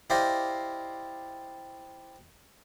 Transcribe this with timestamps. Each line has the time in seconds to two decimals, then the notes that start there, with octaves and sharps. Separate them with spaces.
0.10 E4 G4 C5 D5 D#5 F5